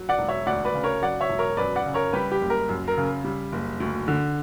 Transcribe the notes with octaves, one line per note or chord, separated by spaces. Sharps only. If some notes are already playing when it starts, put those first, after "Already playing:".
Already playing: F#3
D5 F#5
E1
C#5 E5
D2 D5 F#5
B4 D5
C#3
A#4 C#5
F#3 D5 F#5
C#5 E5
E1
A#4 C#5
F#2 B4 D5
D5 F#5
C#3
A#4 C#5
G3 G4 B4
G4
F#1
A#4
F#2
A#4
C#3
G3
F#1
D2
D3